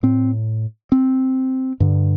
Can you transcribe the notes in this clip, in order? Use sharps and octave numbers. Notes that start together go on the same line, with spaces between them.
A2 C4
C4
G2 D3